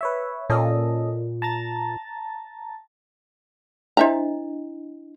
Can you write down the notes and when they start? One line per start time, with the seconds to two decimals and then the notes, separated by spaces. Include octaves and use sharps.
0.01 B4 C#5 E5
0.50 A#2 C#4 A4 D#5
1.42 A5 A#5 A6
3.97 D4 E4 C5 D#5 E5 A#5